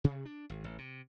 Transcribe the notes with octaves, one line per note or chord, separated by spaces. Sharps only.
C3
D4
G#1
A1
C3